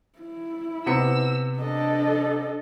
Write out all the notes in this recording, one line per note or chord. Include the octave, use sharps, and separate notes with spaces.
E4
C3 B3 E6 C#7
D4 A4 D#5